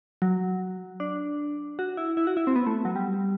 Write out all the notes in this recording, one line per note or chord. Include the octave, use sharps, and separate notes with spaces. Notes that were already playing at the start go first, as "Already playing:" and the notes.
F#3
D4
F#4
E4
E4
F#4
E4
C4
B3
A3
F#3
G3